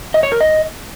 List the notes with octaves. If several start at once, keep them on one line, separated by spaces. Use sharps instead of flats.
D#5
C#5
A#4
D#5